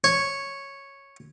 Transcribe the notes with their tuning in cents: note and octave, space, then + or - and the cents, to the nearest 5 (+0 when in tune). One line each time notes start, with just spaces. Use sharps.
C#5 -5